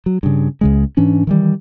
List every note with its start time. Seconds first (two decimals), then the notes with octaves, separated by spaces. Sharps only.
0.06 F#3
0.23 G2 C#3
0.61 C#2 C#3 G#3
0.97 G#2 E3 C#4 D4
1.27 D#3 E3 G3